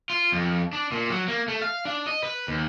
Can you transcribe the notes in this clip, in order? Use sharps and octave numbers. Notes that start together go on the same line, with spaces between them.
F4
F2
D4
A#2
F#3
A#3
A3
F5
D4
D#5
B4
D#2